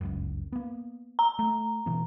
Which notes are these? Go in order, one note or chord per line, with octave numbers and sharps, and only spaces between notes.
G1 C#2 F#2
A#3 B3
A#5
A3
B2 E3 B3